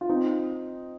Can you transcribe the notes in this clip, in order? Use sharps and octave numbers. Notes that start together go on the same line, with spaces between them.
F4
C4 D#4